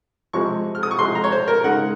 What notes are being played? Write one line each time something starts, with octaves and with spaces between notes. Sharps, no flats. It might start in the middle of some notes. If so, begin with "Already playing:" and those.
C3 F3 G#3 C4 C#6
F6
D#6
C#6
C3 F3 G#3 C4 C6
A#5
C#5
C5
A#4
C#3 G#3 D#4 F#5